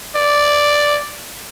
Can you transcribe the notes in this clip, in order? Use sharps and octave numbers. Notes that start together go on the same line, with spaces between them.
D5